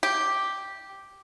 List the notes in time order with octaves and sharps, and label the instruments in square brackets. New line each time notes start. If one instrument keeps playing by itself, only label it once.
[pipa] G4